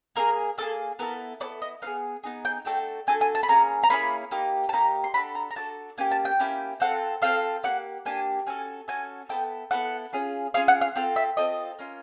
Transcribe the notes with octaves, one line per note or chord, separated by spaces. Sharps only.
A#3 D#4 G#4 A#4
A#3 D#4 G#4 A4
B3 E4 A4 A#4
B3 E4 A4 D5
D#5
B3 D#4 G#4 F5
B3 D#4 G#4
G5
A3 D4 F#4 A4 G5
A3 D4 F#4 A4 G#5
G#5
A5
B5
A#3 C#4 G#4 A#5
A#5
A#3 C#4 E4 G#4 B5
A#3 D#4 G4
A5
A#3 D#4 G4 A#5
C6
D4 F#4 A4 B5
A#5
A#5
D4 F#4 A4 A5
A#3 C#4 G4 G#5
A5
G5
A#3 C#4 E4 G4
C4 F4 A4 F#5
C4 F4 A4 F5
A#3 D4 G4 F#5
A#3 D4 G4 G#5
C#4 F#4 A4 G#5
C#4 F#4 A4 G#5
B3 E4 A4 G5
B3 E4 A4 F#5
C#4 F4 G#4
C#4 F4 G#4 F5
F#5
F5
C4 F4 A4 F5
E5
C4 F4 A4 D#5
A#3 C#4 F4